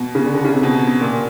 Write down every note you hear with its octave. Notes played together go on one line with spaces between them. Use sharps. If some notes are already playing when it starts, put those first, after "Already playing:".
Already playing: B2
C#3
D3
D3
C#3
C3
B2
A#2